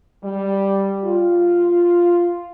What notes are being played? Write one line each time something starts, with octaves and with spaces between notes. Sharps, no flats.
G3
F4